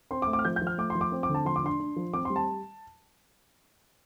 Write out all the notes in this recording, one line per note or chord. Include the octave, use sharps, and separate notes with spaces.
C4 C6
D6
A3
D6
F6
F3 G6
G6
F3
F6
A3 D6
C6
F3
D6
C4
D6
D3
A5
F3 C6
D6
D4 C6
D4
F3
C4 D6
G3 C6
A5